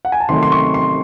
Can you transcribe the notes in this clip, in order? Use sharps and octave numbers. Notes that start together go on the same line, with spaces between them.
F#5
G#5
A5
C3 D#3 F#3 A3 C6
C6
C#6
C6